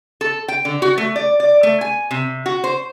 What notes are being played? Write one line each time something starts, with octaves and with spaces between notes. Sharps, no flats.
A4
G5
D3
F#4
A3
D5
D5
A3
G#5
C3
F#4
C5